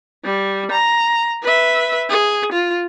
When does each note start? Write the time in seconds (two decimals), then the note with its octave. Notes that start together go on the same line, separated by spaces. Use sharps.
0.24 G3
0.72 A#5
1.43 B4 E5
2.09 G#4
2.52 F4